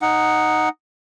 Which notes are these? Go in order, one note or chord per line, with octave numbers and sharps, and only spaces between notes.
D#4 F#5